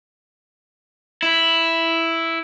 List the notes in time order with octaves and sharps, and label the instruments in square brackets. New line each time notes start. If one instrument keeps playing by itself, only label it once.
[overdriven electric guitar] E4